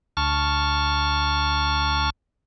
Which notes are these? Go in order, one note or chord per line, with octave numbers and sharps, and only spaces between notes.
D2 A5 C#6 F6